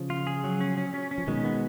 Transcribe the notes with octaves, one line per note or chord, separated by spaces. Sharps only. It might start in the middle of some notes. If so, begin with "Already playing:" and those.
Already playing: C#3 F3
F4
G#4
F#3
C#4
C#4
C#4
C#4
F3
B2 D#3 G#3
B3